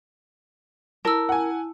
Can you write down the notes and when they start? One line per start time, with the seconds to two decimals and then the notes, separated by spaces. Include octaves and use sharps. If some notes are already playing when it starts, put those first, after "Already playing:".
1.05 E4 A#4 A5 E6
1.29 F#5 G#5